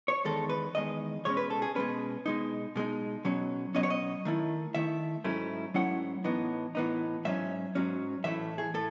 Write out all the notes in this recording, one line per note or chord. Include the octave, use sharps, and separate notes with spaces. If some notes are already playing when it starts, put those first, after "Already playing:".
C#5
E2 D#3 G#3 A4
B4
E2 D#3 G#3 D#5
B2 G#3 C#4 C#5
B4
A4
G#4
B2 G#3 C#4 B4
B2 G#3 D#4
B2 G#3 D#4
B2 F#3 C#4
B2 F#3 C#4 D#5
C#5
D#5
D#3 A3 E4
D#3 A3 E4 E5
G#2 F#3 A3 C#4 E4
G#2 F#3 A3 C#4 E4 F#5
A2 E3 B3 D#4
A2 E3 B3 D#4
G#2 F#3 C#4 E5
G#2 F#3 C#4
A2 E3 A3 E4 E5
G#4
A2 A4